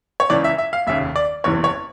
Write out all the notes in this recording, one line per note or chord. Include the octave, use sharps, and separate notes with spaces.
C#5
C#2 C#3 E3 D5
E5
E5
F5
F1 D#2 C#3 E5
D5
F#1 E2 C3 E3 C#5
C#5